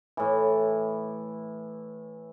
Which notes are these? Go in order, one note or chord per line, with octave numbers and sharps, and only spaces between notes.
A2 E3